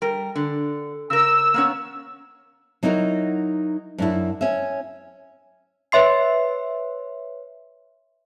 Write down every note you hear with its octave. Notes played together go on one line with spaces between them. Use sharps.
G3 A#4
D3
C#3 A#4 E6
A#3 B3 C#4
F#3 D#4 E4 F#4 A#4
F#2 D4 E4
C#4 E5
B4 C#5 E5 C6 C7